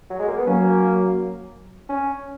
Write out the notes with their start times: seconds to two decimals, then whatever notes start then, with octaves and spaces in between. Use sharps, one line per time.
0.10 F#3
0.19 G#3
0.28 A#3
0.37 B3
0.46 F#3 A#3 C#4
1.89 C#4